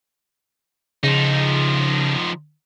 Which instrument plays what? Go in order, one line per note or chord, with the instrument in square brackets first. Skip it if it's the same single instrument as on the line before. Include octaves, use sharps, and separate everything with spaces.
[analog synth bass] C#3 [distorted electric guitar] F3 D#4